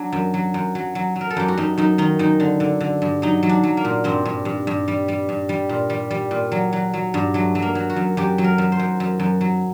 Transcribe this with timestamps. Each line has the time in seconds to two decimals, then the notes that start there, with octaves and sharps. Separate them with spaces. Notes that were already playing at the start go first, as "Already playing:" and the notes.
Already playing: F#3 D4
0.12 F#2
0.34 F#3
0.54 F#2
0.75 F#3
0.95 F#3
1.16 F#3
1.21 A#4
1.30 A4
1.37 F#2 G4
1.48 F#4
1.58 F#2 D#4
1.78 F#2 D#4
1.98 D#3 D#4
2.19 F#2 D#4
2.40 D3
2.60 D3
2.80 D3
3.02 G2
3.22 F#3 D#4
3.43 F#3
3.49 D4
3.63 F#3
3.77 A#3
3.85 A#2
4.04 G2 C4
4.25 G2
4.45 G2
4.67 G2
4.88 G3
5.08 G3
5.29 G2
5.49 G3
5.69 A#2
5.90 G3
6.11 G3
6.31 A#2
6.52 F#3
6.73 F#3
6.94 F#3
7.14 G2
7.34 F#3 A3
7.55 F#3
7.62 A#3
7.75 F#3
7.90 F#4
7.96 F#2
8.17 F#2 G4
8.38 F#3
8.44 A#4
8.58 F#2
8.72 C5
8.79 F#2
9.00 F#2
9.20 F#2
9.41 F#3